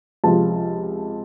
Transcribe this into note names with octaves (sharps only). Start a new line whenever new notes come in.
C#2 C3 F3 A5